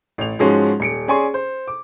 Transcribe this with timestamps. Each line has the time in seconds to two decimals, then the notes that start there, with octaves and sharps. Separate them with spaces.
0.18 A1 F7
0.39 G#2 F3 G#3 C#4 F#4
0.80 D#1 C#7 D7
1.08 C#4 G#4 D5 G#5 C6 C#6
1.34 C5
1.68 D6